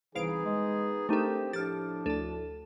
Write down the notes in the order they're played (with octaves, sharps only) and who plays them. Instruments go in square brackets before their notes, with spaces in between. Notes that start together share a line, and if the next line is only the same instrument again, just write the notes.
[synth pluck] C2 F5 D7 [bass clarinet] E3 [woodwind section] B3 D#4 G#4
[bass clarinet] G#3
[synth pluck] A3 D#4 [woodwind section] C4 G4 [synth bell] D4 A4 [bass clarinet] A#4
[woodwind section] A2 F3 [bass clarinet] D4 [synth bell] G4 F6 [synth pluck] A6
[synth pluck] D2 [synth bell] A4 A5